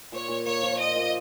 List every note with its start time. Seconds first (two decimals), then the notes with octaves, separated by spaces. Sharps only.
0.12 A#2 C#5
0.28 A#2
0.46 A#3 C#5
0.63 F3
0.79 A#2 D#5
0.96 A#2